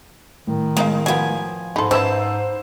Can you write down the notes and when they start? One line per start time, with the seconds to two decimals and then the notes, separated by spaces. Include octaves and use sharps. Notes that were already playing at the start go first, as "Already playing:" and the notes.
0.47 A2 D#3
0.77 G#3 B3 D#4 F5
1.06 F3 F#3 B3 G#5
1.76 G#2 D#4 A4 B5 C6
1.91 C#4 D#4 E4 B4 C5 A5 E6